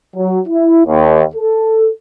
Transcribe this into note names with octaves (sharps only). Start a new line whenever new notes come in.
F#3
E4
D#2
A4